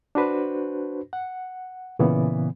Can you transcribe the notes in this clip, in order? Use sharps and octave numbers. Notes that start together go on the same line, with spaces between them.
D4 F#4 B4 C5
F#5
A#2 C#3 E3 B3